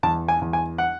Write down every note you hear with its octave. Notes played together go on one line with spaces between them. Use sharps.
E2 A5
G#5
E2
G#5
F#5